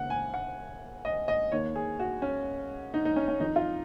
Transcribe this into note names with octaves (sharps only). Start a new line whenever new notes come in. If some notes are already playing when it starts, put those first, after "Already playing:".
Already playing: D#2 C#3 F#5
G#5
F#5
D#5
D#5
D#2 D#3 C#5
G#4
F#4
C#4
D#4
D#4
C#4
C#4
F2 D#3 D#4
F4